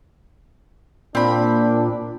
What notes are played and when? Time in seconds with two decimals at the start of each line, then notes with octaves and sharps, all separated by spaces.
1.15 A#2 C4 D4 B5